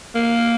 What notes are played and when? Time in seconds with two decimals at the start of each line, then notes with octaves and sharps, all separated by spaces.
0.15 A#3